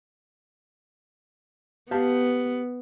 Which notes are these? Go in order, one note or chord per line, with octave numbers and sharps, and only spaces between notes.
B3 G4 F5 A5